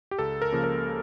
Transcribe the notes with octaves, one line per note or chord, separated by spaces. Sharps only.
G4
C#2 A4
A#4
C#3 F3 A#3
A#4